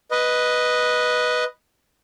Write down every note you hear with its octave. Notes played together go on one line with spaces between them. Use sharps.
B4 D#5